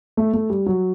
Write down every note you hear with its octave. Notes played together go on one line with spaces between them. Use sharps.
A3
A3
G3
F#3